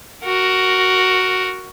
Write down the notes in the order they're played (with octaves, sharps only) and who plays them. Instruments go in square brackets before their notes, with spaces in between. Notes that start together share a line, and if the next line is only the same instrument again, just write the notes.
[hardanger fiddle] F#4 A#4